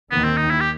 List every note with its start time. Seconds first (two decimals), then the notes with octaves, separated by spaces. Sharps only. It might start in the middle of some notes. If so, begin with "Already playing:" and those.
0.11 D#2 D#3 B3
0.24 C4
0.37 D#4
0.50 E4
0.60 G4